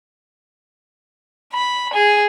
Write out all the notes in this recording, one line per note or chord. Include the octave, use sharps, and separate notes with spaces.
B5
G#4